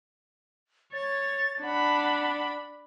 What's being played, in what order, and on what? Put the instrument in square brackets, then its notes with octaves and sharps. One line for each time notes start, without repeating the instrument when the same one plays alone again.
[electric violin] C#5 [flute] A6
[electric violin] D4 B5 [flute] F#5